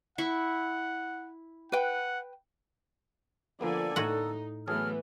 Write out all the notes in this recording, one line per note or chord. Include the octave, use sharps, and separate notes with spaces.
E4 F#5 C#6
B4 F#5 G5
D3 F3 A#3 B3 A4 D5 G#5
A2 D#4 F#4 F#5
E3 F#3 A3 B3 G#4 A4 F6